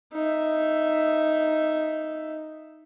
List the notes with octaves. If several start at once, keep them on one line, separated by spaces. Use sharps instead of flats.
D#4 E5